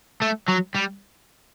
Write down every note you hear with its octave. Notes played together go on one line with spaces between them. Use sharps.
A3
F#3
G3